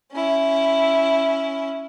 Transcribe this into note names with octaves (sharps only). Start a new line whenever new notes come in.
C#4 E4